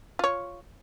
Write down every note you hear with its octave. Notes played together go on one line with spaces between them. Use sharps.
F4 C#5